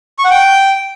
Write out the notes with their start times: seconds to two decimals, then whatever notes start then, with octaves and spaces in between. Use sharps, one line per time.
0.18 C#6
0.24 F#5
0.30 G5